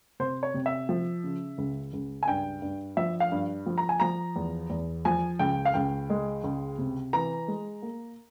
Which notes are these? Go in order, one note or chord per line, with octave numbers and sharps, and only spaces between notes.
C3 C5
C#5
C3
E5
F3
C#3
C#2
C#2
G#5
G2 G5
G2
F3 E5
F5
G2
F3
A#5
G#5
F3 A#5
E2
E2
F3 G#5
C#2 G5
F5
C#2 G5
G#3
C#2
C3
E3 A#5
G#3
A#3